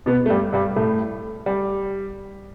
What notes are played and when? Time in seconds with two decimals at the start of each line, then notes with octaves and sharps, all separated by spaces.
0.06 B2 B3
0.26 A3
0.30 G2 G3
0.53 G2 G3
0.76 A2 A3
1.46 G3